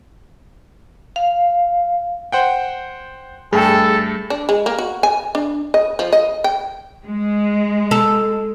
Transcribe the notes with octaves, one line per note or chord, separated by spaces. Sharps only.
F5
C5 F#5 G5
G2 A3 G#4 A4 G5
D4
G#3
A#3
F#4
G#5
D4
D#5
F3
D#5
G5
G#3
A4